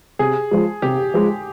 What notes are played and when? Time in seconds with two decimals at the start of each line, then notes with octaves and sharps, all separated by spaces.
0.19 C3 G#4
0.51 F3 G#3
0.82 C3 G4
1.14 F3 G#3